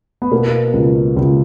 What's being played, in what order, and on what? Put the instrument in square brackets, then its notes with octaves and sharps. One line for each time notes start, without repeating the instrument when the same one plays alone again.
[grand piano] B3
[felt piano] B2 [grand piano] A#3
[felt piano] C#2
C#2